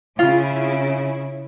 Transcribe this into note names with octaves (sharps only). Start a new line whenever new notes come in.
C#3 E4 F4